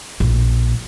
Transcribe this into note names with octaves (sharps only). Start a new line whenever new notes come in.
A#1